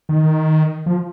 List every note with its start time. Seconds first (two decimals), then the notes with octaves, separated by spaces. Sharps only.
0.09 D#3
0.86 F3